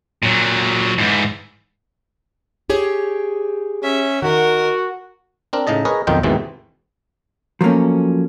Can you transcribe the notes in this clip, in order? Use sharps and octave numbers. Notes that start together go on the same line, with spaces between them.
A#2 F#3
G#2 E3
G4 G#4 C#5
C#4 E5
D#3 F#4 A#4
C4 D4 A#4
A2 C#3 D#4 D#5 A5
G#4 A#4 B4 C#5 D#5
B1 F2 D#3 D#4 F4 G5
D#2 G#2 B2 D#3 E3 C4
F3 F#3 A3 A#3 C#4